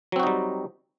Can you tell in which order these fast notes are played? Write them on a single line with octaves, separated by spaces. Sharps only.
F#3 C4 F#4 D#4 G3